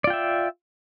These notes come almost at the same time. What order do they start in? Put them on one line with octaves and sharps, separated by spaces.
D5 F4 G5 E5